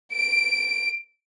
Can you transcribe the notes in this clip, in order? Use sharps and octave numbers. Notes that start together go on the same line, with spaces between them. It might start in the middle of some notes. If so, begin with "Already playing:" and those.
D7